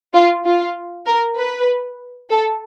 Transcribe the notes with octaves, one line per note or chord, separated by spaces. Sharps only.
F4
F4
A#4
B4
A4